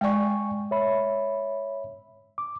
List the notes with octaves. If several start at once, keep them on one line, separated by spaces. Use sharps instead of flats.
G#3 D5 G5 G#5 C#6
C#5 E5 B5
D6